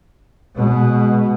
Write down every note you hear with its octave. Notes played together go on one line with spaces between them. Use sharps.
B2 G#3